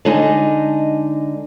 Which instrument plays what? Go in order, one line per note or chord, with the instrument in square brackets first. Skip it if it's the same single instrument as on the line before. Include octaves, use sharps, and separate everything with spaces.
[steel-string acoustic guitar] D3 G#3 D#4 D#5 G#5